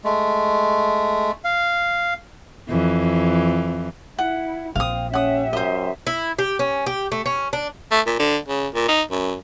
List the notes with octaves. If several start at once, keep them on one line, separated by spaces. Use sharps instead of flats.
G#3 A3
F5
F2 E3
E4 F#5
A#1 C4 F5 D#6
C#4 G4 E5 F#5 D#6
F#2 C5 D#5
E4
G4
C#4
G4
A3
C#4
D4
A3
A#2
D3
C#3
A#2
D#4
F#2